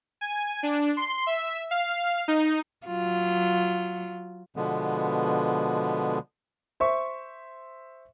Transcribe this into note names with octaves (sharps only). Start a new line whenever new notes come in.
G#5
D4
C6
E5
F5
D#4
F#3 F4
B2 D3 F3 G#3 B3
C5 E5 C#6